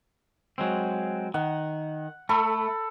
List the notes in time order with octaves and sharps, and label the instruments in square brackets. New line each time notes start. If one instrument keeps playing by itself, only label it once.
[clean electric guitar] F#3 G#3 C4
[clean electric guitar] D#3 [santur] F#5
[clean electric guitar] A3 [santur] A4 B5